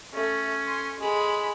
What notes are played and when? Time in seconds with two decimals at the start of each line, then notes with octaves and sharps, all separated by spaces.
0.14 A3 C#4
0.67 C6
0.99 G#3 B5